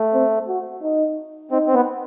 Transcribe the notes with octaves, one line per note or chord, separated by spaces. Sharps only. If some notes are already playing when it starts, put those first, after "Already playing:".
Already playing: A3
C4
F#4
D#4
C4 D#4
C4
B3